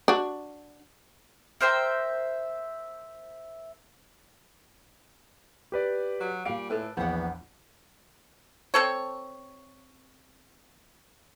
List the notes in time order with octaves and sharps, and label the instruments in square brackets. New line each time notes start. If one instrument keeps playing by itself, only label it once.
[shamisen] D4 F#4
[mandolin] A#4 C5 E5 G5
[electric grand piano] G4 B4 D5
[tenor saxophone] F#3
[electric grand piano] A#2 D7 [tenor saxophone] G3 [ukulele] F5
[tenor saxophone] A2 [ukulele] A4 B4
[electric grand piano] A#1 E2 [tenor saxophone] B3 [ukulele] C5 F#5
[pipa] C4 A4 C#5